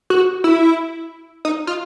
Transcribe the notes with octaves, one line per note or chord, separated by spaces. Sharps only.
F#4
E4
D#4
F4